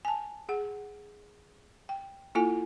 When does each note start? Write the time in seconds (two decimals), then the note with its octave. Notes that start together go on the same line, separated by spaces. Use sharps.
0.05 G#5 A5
0.49 G#4 F#5
1.89 G5
2.35 A#3 E4 F4 A4 G#5